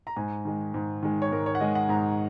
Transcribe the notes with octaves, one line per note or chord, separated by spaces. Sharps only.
A#5
G#2 G#5
D#3 G#3
G#2
D#3 G#3
C#5
G#2 A#4
C#5
F#5
D#3 G#3 D#5
F#5
G#2 A#5